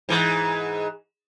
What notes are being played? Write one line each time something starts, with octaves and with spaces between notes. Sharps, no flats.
G#2 E3